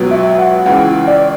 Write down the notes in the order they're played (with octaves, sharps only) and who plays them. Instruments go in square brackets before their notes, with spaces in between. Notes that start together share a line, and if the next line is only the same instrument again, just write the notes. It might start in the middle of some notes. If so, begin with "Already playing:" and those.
Already playing: [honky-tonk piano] C#2 B2 F#3 B3
[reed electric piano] E5
F#5
[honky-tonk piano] C#2 C#3 E3 [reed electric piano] F#5
[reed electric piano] D5